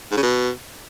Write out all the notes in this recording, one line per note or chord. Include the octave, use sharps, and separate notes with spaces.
G#2
C#3
B2